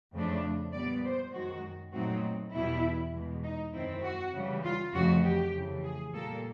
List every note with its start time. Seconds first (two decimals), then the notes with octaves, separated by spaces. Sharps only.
0.14 F2 C#3 F3 A3 D4
0.74 A#2 G3 B3 D5
1.04 C5
1.33 F#2 D#3 G#3 F#4
1.93 A#2 F#3 A3 C4 D#4 F#4
2.53 E2 B2 G3 E4
3.14 E2 B2 G#3
3.44 D#4
3.73 F#2 D#3 G#3 C4 E4
4.04 F#4
4.34 C#3 E3 G3
4.64 F4
4.94 F2 C#3 E3 A3 F#4
5.24 G4
5.53 F2 C#3 E3 A3
5.84 G#4
6.14 A#2 G3 A#3 A4